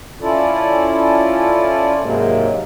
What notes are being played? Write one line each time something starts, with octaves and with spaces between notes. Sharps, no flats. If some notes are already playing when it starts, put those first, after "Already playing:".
C#4 E4 F4 A4 D5
G#2 C3 F#3 G#3 A#3